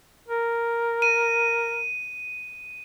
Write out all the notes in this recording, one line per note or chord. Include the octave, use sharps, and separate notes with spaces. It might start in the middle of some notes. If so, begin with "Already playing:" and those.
A#4
D#7